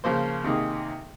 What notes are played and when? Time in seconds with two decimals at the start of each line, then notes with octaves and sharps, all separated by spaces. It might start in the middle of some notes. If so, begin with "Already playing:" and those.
0.04 C#3 F3 A#3 C5
0.44 C3 D#3 A#3 G#4